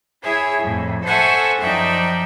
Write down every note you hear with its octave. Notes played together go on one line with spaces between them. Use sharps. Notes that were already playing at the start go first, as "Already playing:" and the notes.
E4 G#4 C#5 E5
F2 A2
A4 C5 E5 F#5 G#5 C#6
F#2 F3 D#4 D5 E5 G5